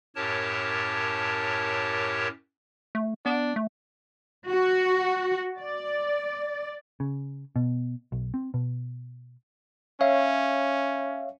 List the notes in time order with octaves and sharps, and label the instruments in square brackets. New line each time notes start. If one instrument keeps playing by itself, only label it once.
[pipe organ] F#2 A2 G4 A#4 C#5 A5
[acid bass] A3
[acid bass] B3 [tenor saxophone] D4
[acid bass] A3
[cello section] F#4
D5
[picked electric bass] C#3
B2
B1
C4
B2
[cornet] C#4 [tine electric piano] C#5 E5 F5